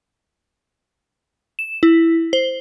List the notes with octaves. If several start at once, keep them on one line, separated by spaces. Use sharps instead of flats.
E7
E4
C5